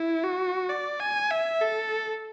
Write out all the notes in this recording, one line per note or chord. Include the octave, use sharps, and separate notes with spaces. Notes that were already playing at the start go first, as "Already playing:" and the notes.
Already playing: E4
F#4
D5
G#5
E5
A4